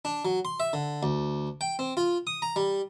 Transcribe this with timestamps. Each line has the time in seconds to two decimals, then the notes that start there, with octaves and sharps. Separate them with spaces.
0.05 D4
0.25 F#3
0.45 C6
0.60 E5
0.73 D3
1.03 D2
1.61 G5
1.79 C4
1.97 F4
2.27 D#6
2.42 A#5
2.56 G3